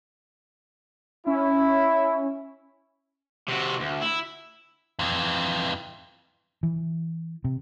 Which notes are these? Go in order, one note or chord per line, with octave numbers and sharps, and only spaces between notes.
C#4 E4
C3 F#4
D2
E4
F2 E3
E3
C3